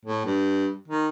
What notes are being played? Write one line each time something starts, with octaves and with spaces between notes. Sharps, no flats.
A2
G2
D#3